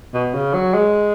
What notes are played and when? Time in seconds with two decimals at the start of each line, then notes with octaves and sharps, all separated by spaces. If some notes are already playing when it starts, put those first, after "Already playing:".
0.14 B2
0.34 C#3
0.54 F#3
0.74 G#3